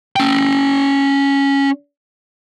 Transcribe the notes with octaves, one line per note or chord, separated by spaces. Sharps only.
C#4 G5